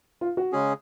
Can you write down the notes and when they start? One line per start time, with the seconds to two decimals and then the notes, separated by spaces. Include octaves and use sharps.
0.21 F4
0.37 F#4
0.52 C#3 G#3 C#4 G#4